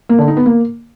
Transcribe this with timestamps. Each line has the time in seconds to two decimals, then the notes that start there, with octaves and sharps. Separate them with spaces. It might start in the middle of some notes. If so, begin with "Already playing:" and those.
0.09 A#3
0.19 D3
0.28 D#4
0.37 B3
0.46 A#3